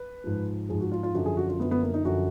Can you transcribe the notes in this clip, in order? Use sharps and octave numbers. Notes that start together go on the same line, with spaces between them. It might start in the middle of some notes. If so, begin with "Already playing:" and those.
Already playing: B4
G#2 F3
G#2 F3 G#4
F#4
F4
F4
F#2 D3 F3 F#4
G#4
F#4
F4
F#2 D3 F3 B3
B3
A#3
D#4
F#2 D3 F3 F#4